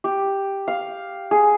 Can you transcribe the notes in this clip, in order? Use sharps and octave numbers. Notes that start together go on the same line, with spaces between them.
G4
F5
G#4